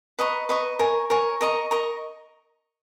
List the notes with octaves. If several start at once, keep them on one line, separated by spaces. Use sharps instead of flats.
B4 D#5 A#5 C#6
B4 D#5 A#5 C#6
A#4 C#5 G#5
A#4 C#5 G#5
A#4 D#5 A#5 C#6
A#4 D#5 A#5 C#6